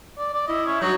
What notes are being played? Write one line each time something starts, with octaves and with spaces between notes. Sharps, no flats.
D5
D5
E4 D#5
C#4
G2 F#3 D#4